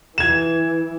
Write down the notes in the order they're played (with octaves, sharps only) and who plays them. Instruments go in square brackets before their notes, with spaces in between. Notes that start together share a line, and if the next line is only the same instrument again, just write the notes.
[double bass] E3 [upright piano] G#6 E7